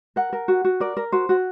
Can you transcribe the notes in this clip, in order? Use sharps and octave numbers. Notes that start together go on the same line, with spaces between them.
A#4 F#5
A#4
F#4
F#4
A#4 D5
A#4
F#4 C5
F#4